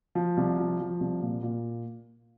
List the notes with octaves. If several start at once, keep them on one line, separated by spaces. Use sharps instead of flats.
F3
C2
F3
F3
C2
A#2
A#2